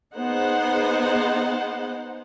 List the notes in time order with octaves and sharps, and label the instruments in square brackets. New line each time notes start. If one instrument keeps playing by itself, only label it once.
[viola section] B3 D#4 G#4 C5 F#5